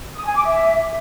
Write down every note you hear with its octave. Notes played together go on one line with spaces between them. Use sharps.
D#6
G#5
D6
E5